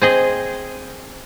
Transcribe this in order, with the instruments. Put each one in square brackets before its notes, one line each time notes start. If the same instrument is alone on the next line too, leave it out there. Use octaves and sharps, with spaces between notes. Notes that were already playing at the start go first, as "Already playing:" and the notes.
[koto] C4 G#4 D#5